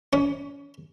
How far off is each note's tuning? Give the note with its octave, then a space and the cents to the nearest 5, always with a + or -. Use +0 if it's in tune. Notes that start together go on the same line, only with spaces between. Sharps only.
C#4 +30